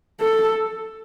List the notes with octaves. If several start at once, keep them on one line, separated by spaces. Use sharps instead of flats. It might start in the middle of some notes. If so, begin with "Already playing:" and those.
A4